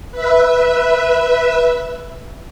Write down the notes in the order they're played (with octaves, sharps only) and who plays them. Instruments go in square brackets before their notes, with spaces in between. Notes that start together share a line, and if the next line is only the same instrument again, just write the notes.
[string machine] B4 E5